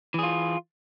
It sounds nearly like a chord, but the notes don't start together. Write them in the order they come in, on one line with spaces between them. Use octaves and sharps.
E3 G#4 F4